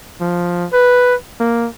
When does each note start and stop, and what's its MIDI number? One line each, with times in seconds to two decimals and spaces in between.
0.21 0.66 53
0.73 1.15 71
1.40 1.68 58